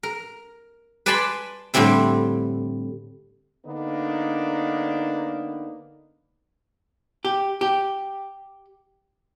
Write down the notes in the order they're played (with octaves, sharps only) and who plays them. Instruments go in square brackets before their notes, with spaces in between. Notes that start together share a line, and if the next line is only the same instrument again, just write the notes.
[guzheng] A#4
B4 D5 G#5 A5 B5 C6
A2 D3 G3 C4 E4
[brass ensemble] D3 A#3 B3 D4 D#4
[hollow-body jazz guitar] G4
G4